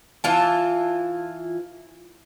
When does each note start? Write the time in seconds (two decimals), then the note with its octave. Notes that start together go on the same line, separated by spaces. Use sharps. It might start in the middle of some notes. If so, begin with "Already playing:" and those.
0.24 E3 F4 A5